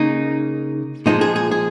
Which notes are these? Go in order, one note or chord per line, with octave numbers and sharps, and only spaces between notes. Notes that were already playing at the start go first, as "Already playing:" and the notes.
Already playing: C#3 A#3 D#4
A#2 F3 G#3 D#4
G#4
G#4
G#4